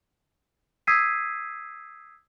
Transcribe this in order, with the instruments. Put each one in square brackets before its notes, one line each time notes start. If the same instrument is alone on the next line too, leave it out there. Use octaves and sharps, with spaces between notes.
[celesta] D#6 E6 G#6 B6 C7 D#7